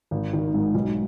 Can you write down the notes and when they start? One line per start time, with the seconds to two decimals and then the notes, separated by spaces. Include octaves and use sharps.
0.11 G#1
0.33 D#3
0.54 G#2
0.74 B1